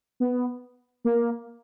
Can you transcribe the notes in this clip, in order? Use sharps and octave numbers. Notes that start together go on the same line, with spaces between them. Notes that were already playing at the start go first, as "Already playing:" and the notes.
B3
A#3